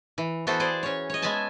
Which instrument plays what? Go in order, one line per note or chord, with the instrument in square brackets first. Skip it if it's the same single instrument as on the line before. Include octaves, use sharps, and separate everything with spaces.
[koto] E3
E3 B3 F#4 A4 C5
G#4 C5 D5
C#4 C#5
C#5 D#5
G#3 B3 E5 G#5 A5